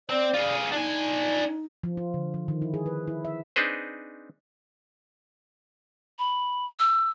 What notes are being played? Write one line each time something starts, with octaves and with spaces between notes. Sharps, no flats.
C4 D5
F4 G#4
D4 D#4 G#5
F3
F4
D3
F3
D#3
E4
G#4
B4
E4
E5
C4 D4 D#4 G#4 B4 C5
B5
E6